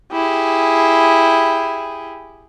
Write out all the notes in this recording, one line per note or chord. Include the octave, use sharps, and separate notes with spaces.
E4 G4 G#4